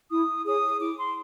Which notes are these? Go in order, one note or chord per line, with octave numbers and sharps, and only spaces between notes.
E4 D#6
G#4 C#5 D#6
E4 D6
C6